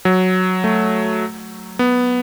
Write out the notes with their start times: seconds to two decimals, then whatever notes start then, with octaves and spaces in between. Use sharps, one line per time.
0.05 F#3
0.64 A3
1.79 B3